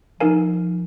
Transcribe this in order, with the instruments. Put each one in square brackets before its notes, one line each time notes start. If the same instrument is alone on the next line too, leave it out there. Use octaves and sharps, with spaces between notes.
[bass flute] F3 [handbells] D#4 A#4 F5 G#5